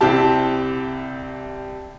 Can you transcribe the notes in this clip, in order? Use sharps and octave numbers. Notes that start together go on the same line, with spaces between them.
C2 C4 E4 G4 A5